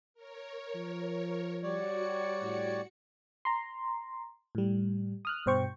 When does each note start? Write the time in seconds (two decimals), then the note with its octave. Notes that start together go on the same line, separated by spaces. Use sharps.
0.14 A#4 C#5
0.75 F3
1.63 G3 F#4 C#5 D5 C#7
2.42 A2
3.45 A#5 C6
4.55 A2 G3
5.25 D#6 F6 F#6
5.46 G2 B2 C5 G5 C#6